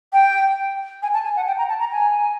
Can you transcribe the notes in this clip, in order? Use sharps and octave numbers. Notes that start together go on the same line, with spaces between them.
G5
G#5
A5
G#5
F#5
G5
A#5
A5
A#5
G#5